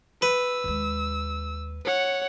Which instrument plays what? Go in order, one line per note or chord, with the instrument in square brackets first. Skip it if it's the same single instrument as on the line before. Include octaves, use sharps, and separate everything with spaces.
[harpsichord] B4 [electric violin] E6
[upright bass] D#2 G#3
[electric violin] C#5 F#5